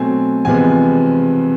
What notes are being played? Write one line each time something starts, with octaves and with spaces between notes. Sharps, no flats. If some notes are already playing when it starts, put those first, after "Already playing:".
Already playing: B2 F#3 A3 C4 G#5
E2 C3 F3 G#3 B3 G#5